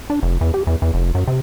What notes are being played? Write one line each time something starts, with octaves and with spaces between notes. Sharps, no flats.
D4
F1
E2
G4
E2
E2
F1
F#2
C3